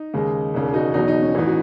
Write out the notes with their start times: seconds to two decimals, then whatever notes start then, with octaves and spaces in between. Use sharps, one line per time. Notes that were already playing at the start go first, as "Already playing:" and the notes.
Already playing: D#4
0.14 D#2 C#3 G#3
0.54 E1 D#2 C#3
0.74 D#4 F#4
0.94 E2 B2 F#3 D#4
1.08 D#4
1.22 C#4
1.35 A1 A2 E3 D#4
1.47 F#4